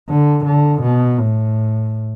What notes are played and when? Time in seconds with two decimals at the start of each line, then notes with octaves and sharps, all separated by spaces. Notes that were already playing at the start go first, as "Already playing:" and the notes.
0.10 D3
0.45 D3
0.82 B2
1.18 A2